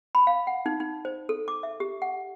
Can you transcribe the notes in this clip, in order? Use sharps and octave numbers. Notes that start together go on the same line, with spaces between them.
B5
F5
F#5
D#4
D#4
C5
A4
D6
E5
G4
F#5